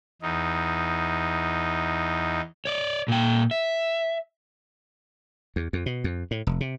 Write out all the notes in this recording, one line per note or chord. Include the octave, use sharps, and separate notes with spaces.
E2 D#4
C#5 D5
A#2 G5
E5
E2
F2
B2
F2
A2
F1
C3